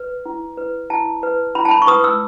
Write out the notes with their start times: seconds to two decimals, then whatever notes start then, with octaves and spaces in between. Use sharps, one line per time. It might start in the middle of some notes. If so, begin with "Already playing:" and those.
Already playing: B4
0.26 E4
0.57 B4
0.90 E4 A5
1.23 B4
1.55 E4 B5
1.65 A5
1.71 B5
1.82 C#6
1.88 B4 D#6
2.04 E6